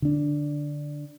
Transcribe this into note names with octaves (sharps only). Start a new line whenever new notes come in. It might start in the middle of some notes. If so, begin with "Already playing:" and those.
D3 D4